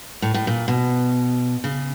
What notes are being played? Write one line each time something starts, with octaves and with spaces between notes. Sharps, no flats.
A2
A2
A#2
B2
C#3